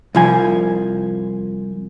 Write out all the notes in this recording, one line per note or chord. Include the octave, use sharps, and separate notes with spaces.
C2 F3 G#5